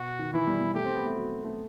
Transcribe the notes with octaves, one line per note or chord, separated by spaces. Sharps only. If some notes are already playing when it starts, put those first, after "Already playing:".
Already playing: B2 F#4
D#3
E3 E4
G3
G3
A3 G4
C4
B3
A3
F#3
A3